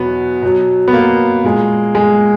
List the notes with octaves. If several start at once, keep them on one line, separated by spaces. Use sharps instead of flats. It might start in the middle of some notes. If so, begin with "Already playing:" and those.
Already playing: E2 B2 F#3 B3
B2 F#3
B3
A#3
A#2 G#3
G#3